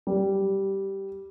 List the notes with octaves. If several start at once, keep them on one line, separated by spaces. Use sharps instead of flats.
G3